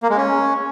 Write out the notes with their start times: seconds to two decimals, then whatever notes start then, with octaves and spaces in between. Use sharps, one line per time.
0.03 A#3
0.10 G#3
0.17 C#4